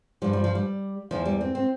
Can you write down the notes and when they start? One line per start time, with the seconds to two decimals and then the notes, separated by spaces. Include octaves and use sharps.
0.22 G2 F3 G3
0.33 G3
0.44 F3
0.55 G3
1.11 E2 E3 F3
1.25 G3
1.41 C4
1.55 C4